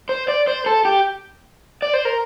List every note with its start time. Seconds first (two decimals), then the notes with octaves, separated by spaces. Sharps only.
0.09 C5
0.28 D5
0.47 C5
0.66 A4
0.85 G4
1.82 D5
1.94 C5
2.05 A#4